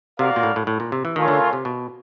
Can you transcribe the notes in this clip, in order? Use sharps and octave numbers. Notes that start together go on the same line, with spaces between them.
C3 F#4 A#4 D5 F5
A#2
A2
A2
A2
A#2
C3
E3
D#3 A3 C#4 F4 A#4 C#5
D3
C3
B2